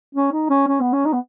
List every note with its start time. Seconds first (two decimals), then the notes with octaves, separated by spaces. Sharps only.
0.15 C#4
0.32 D#4
0.50 C#4
0.68 C#4
0.81 B3
0.93 C#4
1.06 D#4
1.13 B3